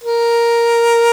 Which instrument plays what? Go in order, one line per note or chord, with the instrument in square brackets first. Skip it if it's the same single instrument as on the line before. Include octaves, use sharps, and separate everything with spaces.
[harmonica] A#4